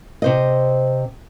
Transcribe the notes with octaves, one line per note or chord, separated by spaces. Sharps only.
C3 C5 D#5